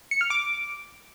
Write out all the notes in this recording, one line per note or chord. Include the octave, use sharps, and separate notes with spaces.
C#7
F6
D6